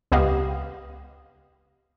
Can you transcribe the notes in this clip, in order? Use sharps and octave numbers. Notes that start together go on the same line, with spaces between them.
C#2 B3 G4 D#5 F5